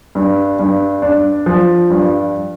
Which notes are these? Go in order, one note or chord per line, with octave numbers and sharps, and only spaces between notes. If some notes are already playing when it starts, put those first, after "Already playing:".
G2
G2
D4
F3
G2